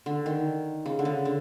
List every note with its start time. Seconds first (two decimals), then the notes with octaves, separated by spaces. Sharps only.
0.06 D3
0.26 D#3
0.86 C#3
0.99 D3
1.05 C#3
1.25 D3